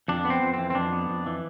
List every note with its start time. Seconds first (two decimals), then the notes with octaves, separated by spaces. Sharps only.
0.08 F2 D4
0.25 B3
0.30 C4
0.42 F2
0.54 E3 C4
0.70 C4
0.75 F2 D4
0.93 B3
1.10 F2
1.26 E3